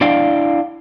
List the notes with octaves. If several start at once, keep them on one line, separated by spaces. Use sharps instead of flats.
D4 E4 D5 F5 G5